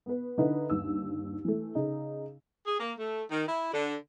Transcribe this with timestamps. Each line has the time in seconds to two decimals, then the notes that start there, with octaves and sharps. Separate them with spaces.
0.06 B3 B4
0.38 D3 D#4 E4 B4
0.70 G1 D#2 E6
1.45 E3 A3
1.75 C#3 D#4
2.67 G#4
2.80 A#3
2.99 A3
3.30 D#3
3.49 E4
3.73 D3